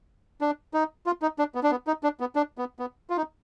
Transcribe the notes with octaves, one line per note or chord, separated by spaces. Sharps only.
D4
D#4
F4
D#4
D4
B3
D4
B3
D#4
D4
B3
D4
B3
B3
F4
D#4